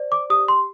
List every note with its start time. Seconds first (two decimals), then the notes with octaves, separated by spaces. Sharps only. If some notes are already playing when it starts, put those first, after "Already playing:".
Already playing: C5 D5
0.12 D6
0.30 G4 D#6
0.48 C6